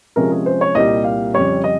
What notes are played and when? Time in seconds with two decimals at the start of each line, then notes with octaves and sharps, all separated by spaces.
0.16 C3 F3 G#3 C#4 A#4
0.32 G#4
0.46 C5
0.61 C#5
0.75 C2 A#2 G3 D#5
1.04 F5
1.34 F2 C#3 G3 C#5
1.64 D#5